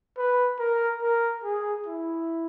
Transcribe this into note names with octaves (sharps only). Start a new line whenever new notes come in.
B4
A#4
A#4
G#4
E4